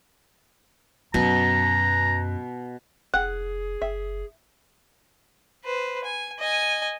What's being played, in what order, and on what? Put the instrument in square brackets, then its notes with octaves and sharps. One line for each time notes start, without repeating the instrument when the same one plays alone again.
[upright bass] F#2 [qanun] B2 [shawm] A#5
[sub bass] F1 [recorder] G#4 [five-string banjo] F#5 [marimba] F#6
[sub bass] F#1 [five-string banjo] E5
[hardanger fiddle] B4 C5
G#5
D#5 G#5